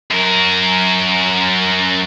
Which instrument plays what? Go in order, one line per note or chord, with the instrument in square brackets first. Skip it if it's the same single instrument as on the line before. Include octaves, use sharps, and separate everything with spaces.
[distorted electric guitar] F#2 A#4